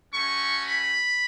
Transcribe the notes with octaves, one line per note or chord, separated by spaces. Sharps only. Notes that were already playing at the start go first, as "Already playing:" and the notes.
A3 C#4 F#4 C#6
B5